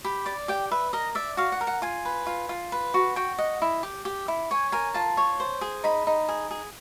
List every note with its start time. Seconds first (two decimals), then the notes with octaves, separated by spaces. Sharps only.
0.04 G4 B5
0.26 D5
0.48 G4 G5
0.71 B4 E5
0.93 A#4 D#5
1.15 D5 E5
1.37 F#4 F5
1.52 F#5
1.61 A#4
1.67 F#5
1.82 F4 G#5
2.05 B4
2.27 F4
2.49 F4
2.72 B4
2.94 F#4
3.16 F#4 G5
3.38 D#5 F#5
3.62 E4
3.83 G4
4.05 G4
4.28 E4
4.51 C#5 G#5
4.72 A#4 G#5
4.94 F4 A5
5.17 C#5
5.40 C5
5.61 G#4
5.84 D#4 B5
6.07 D#4
6.28 G#4
6.51 G#4